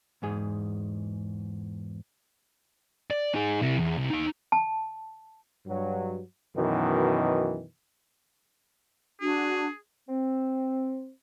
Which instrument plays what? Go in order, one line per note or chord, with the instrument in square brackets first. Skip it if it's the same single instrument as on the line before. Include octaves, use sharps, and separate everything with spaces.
[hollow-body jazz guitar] E2 G#2 G#4
[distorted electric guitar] D5
D#4 G#4
C3 E4
E2
C2
D#4 F5
[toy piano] A5
[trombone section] G2 F#3
F#2 B2 D#3 E3
[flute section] D4 F#4 [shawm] G#4
[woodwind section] C4